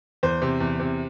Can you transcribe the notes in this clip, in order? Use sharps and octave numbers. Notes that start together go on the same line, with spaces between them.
E2 C5
C3
E2
C3